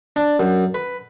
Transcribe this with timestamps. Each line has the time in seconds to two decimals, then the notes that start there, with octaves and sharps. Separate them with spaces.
0.16 D4
0.40 F#2
0.74 B4